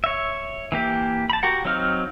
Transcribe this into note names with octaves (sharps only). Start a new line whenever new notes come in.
C#5 E5
E3 A#3 G4
A5 B5
F#4 G4 A#4 F#5
F#3 C4 D#4 F5 F6